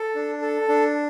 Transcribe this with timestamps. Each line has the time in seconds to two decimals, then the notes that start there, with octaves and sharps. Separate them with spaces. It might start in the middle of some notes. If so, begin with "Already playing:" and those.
Already playing: A4
0.15 D4
0.42 A4
0.68 D4